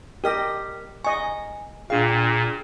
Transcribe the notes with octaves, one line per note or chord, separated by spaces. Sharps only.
G4 A#4 D#5 F6 B6
D#5 G#5 C#6
A#2 D4 G#4 F5 G5